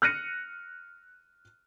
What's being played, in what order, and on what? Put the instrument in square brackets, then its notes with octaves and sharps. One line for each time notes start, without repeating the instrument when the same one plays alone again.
[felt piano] F6 F#6 A#6 C#7 D#7